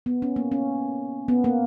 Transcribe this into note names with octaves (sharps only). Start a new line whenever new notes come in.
B3
C#4
A#3
C#4
B3
A#3